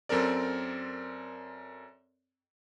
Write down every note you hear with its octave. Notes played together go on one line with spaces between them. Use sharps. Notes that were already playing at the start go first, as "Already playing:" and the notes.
F#2 C4 A4 A#4 D5